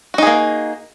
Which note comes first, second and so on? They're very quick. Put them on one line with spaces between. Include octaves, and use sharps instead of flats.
F#4 D#4 G#4 A#3